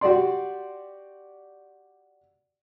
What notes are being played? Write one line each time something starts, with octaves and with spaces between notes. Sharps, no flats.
F#4 G4 D5 C6